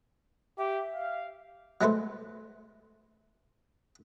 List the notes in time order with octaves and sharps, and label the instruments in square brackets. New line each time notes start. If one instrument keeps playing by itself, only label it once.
[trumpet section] G4 [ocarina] E5
[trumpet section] F5
[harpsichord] F#3 G#3 A3 B4 C5